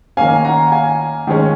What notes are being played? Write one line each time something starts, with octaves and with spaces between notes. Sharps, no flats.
D#3 A#3 C#4 F5 G#5
F#5 A#5
F5 G#5
D#3 G#3 C#4